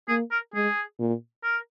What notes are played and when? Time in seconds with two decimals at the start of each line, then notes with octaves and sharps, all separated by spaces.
0.08 A#3 G#4
0.31 A#4
0.54 G#3 G#4
0.99 A#2
1.44 A#4